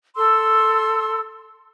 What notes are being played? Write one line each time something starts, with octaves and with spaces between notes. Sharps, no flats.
A4 C6 E6